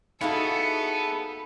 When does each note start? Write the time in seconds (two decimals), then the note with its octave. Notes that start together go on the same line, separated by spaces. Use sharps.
0.21 B3 D#4 E4 F#4 G#4 A4 F5